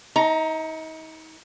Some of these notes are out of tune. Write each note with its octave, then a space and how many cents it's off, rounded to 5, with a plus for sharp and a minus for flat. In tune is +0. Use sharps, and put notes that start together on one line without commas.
D#4 +35 A#5 +0